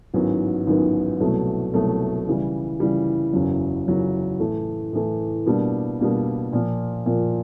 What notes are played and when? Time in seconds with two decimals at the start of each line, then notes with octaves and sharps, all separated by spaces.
0.14 A1 G#2 D#3 F#3 B3
0.67 A1 G#2 D#3 F#3 B3
1.20 C2 B2 F#3 A3
1.74 C2 B2 F#3 A3
2.27 C#3 E3 G3
2.80 C#3 E3 G3
3.33 F#1 E2 C#3 F#3
3.86 F#1 E2 C#3 F#3
4.39 A2 E3 A3
4.93 A2 E3 A3
5.46 B2 G3 A#3 D4
6.00 B2 G3 A#3 D4
6.53 A#2 F3 A#3
7.06 A#2 F3 A#3